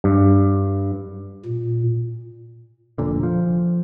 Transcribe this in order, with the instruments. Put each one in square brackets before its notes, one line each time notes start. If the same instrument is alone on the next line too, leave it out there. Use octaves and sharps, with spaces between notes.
[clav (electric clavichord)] G2
[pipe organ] A#2
[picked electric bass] F1 A#2 D3
F3